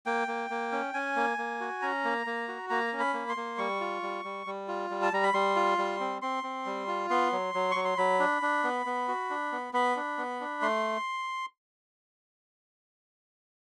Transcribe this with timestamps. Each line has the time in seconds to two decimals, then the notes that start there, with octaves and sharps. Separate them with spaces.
0.06 A#3 G5
0.28 A#3
0.50 A#3
0.72 C#4
0.94 C#4 G#5
1.16 A#3
1.38 A#3
1.60 F#4
1.82 C#4 A#5
2.04 A#3
2.26 A#3
2.48 F#4
2.70 A#3 A#5
2.93 C#4
3.00 B5
3.14 A#3
3.29 C6
3.37 A#3
3.58 G3 C#6
3.81 F4
4.03 G3
4.25 G3
4.47 G3
4.68 F4
4.90 G3
5.02 A5
5.13 G3 A#5
5.23 B5
5.34 G3 C6
5.56 F4
5.78 G3
6.00 C4
6.22 C4 C6
6.43 C4
6.66 G3
6.88 F4
7.10 B3 C6
7.32 F#3
7.54 F#3
7.71 F#3 C#6
7.85 C6
7.98 F#3 B5
8.19 D4
8.42 D4
8.64 B3
8.86 B3
9.08 F#4
9.30 D4
9.52 B3
9.73 B3 B5
9.96 D4
10.18 B3
10.40 D4
10.61 A3 C6